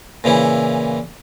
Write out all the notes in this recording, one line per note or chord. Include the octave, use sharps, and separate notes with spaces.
A#2 C#3 E3 E4